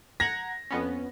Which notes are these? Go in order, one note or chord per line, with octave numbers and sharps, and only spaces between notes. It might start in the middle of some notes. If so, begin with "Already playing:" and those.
F#5 A#5 G#6 A#6
F2 B3 C#4